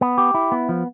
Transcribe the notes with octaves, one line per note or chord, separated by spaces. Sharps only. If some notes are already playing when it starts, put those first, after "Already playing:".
B3
G4
E4
B3
F3